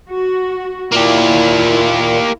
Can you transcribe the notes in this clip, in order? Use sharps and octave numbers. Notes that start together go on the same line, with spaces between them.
F#4
A#2 A#3 E4 F4 G4